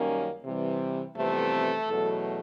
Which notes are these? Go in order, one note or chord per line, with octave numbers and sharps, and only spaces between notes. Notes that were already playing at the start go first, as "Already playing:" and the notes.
Already playing: F#2 D#3 G3 A#3 C#4
C3 E3 G3
F2 C3 E3 G3 A3 B3 A4
E2 B2 F#3 A3